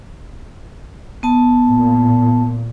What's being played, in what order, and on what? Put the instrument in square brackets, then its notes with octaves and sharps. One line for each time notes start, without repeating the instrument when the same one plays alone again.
[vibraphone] B3 A5
[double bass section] A#2